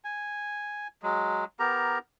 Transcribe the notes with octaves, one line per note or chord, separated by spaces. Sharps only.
G#5
F#3 G#3
B3 G4 A#4 A#5